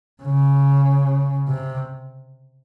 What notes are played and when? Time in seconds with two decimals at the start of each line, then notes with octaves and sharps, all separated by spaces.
0.23 C#3
1.48 C3